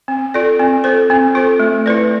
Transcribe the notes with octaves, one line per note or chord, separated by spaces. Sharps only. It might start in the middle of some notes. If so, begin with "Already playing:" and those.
C4
F4 A4 D5
C4
F4 A4 C5
C4
F4 A4 C5
A3
E4 B4 D5